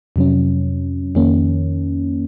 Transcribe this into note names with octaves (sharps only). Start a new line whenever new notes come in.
F2 C3 F#3 C#4
F2 D#3 A#3 C#4